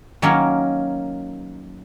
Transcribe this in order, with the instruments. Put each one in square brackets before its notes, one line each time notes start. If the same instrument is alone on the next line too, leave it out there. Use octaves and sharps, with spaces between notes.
[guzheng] D#3 F#3 A#3 C#4 A#4